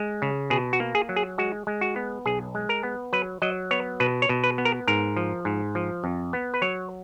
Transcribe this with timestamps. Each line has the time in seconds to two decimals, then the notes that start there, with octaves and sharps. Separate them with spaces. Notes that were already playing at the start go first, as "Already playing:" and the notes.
Already playing: G#3
0.22 C#3
0.50 B2 G#4
0.73 F#4
0.80 A#3
0.95 G#4
1.09 F#3
1.16 G#4
1.38 G#3 F#4
1.67 G#3
1.81 F#4
1.96 B3
2.26 B1 G#4
2.55 G#3
2.69 A#4
2.83 B3
3.13 F#3 B4
3.42 F#3 D#5
3.71 B3 C#5
4.00 B2 B4
4.22 C#5
4.29 B2
4.44 B4
4.58 B3
4.65 A#4
4.87 G#2 A#4
5.17 F3
5.45 G#2
5.75 F3
6.04 F2
6.33 B3
6.54 B4
6.62 F#3 C#5